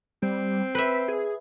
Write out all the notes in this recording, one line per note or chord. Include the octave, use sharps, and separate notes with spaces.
G3 C4
B4 E5 B6
G#4